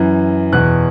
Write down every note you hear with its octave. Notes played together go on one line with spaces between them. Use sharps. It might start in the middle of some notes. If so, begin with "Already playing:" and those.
Already playing: F#2 E3
E2 B2 F#6